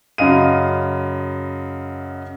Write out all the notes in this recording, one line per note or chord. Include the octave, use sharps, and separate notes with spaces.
F#2 C#3 D#5 F5 D#7